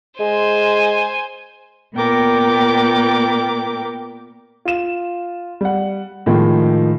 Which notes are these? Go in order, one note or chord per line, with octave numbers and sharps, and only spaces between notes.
G#3 C5 G#5
A#2 B3 A#4 G5 D6
F4 E7
G3 F#5
A2 D#3 F3 G#3